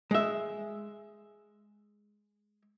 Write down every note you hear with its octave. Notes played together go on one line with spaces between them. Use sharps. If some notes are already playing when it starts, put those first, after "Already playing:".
G#3 E5